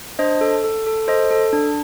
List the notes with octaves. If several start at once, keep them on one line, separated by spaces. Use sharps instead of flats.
D4 C5 D#5
A4
A4
A4
A4 C5 D#5
A4
D4